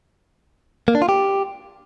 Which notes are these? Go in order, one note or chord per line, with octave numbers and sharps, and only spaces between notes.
A#3
D4
F4
G4